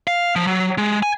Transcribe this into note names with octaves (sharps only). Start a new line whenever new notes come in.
F5
F3
F#3
G#3
G#5